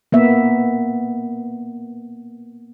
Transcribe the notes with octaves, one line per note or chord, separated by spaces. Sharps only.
A#3 B3 E5